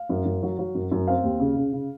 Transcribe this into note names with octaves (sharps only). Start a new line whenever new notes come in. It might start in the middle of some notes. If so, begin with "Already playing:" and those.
Already playing: F5
F#2
F#2
F#3
F#3
F#2
F#2
C4 F5
D#2
C#3
C#3
C#3